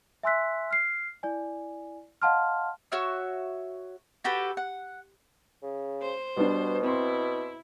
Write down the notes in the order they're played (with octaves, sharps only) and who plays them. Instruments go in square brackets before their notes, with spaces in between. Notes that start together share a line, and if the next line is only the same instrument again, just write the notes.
[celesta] E5 G#5 C6 E6 F#6 B6
F6 C7
E4 D5 G#5
D#5 F5 F#5 A5 C6 F6
[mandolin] F#4 C#5 E5 F6
F#4 G4 A4 B4
F#5
[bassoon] C#3
[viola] C5
[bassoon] B2 [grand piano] G3 B3 D4
[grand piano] C4 C6 [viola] E4